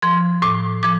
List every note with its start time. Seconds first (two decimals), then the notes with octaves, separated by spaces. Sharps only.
0.02 F3 C6
0.42 A2 D6
0.83 F3 D6